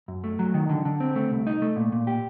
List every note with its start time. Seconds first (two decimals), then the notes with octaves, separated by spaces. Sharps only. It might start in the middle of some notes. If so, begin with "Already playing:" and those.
0.08 F#2
0.24 A3
0.39 F#3
0.54 D#3
0.69 D3
0.85 D3
1.00 C4
1.16 A3
1.31 C2
1.47 D#4
1.62 A3
1.76 A#2
1.92 A#2
2.07 G4